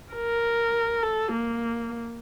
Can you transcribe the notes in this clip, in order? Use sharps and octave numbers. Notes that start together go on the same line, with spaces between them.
A#4
A4
A#3